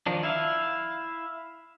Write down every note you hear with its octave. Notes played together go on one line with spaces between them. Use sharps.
D#3 F3 D4
E4 E5 F5